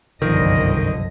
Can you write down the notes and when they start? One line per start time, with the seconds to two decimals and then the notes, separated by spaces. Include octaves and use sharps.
0.22 F#1 C2 G2 B2 D3 D#3 F3 D#5